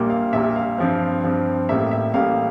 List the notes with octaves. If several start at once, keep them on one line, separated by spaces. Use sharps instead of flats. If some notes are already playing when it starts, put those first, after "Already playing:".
Already playing: A#1 A#2 G3 A#3
F5
A#1 A#2 G3 A#3 E5
F5
G2 F3 C4
G2 F3 C4
A1 A2 G3 A#3 E5
E5
A1 A2 G3 A#3 F5